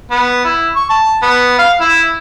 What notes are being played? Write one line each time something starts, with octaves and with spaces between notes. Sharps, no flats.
B3
E4
C#6
A5
B3
F5
E4